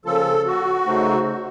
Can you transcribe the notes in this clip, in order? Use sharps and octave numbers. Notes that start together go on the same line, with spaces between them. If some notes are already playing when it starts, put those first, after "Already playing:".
C#3 F3 A#3 C#4 F4 A4
F#4
C#3 A3 D#4 A4 C5